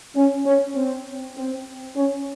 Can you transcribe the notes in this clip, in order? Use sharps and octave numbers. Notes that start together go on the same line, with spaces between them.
C#4
C#4
C4
C4
C#4